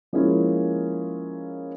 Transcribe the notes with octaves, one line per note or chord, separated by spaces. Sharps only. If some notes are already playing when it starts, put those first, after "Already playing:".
F3 G#3 A#3 C#4 E4